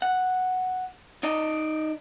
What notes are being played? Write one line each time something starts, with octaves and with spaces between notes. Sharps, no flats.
F#5
D#4 D5 D#5